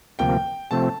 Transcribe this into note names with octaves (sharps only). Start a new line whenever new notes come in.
D2 C3 F3 A#3 G5
C3 F3 A3 C4 A5